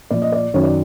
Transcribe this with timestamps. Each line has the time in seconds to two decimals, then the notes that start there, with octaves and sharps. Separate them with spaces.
0.11 A#2 F3 D5
0.22 D#5
0.32 D5
0.54 F#2 D#3 F#3 C#5
0.63 D5